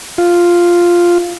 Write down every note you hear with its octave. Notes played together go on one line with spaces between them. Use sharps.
F4